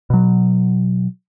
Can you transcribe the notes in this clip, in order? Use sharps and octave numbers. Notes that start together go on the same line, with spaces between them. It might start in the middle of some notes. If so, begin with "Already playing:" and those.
B2 F#3